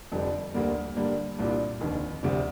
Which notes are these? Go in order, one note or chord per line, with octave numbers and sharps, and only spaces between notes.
F1 F2 D3 G3 D4
D2 D3 G3 A#3
G2 D3 G3 A#3
C2 A#2 G3 D4
F1 D#2 D3
D2 C3 G3